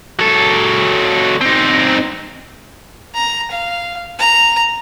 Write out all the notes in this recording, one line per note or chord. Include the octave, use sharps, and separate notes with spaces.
F#3 A4
C4 D#4
A#5
F5
A#5